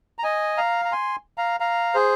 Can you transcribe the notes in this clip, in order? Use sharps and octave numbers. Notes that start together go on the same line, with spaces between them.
A#5
D#5 G#5
F5 A#5
A#5
G#5 C6
F5 A#5
F5 A#5
G#4 C5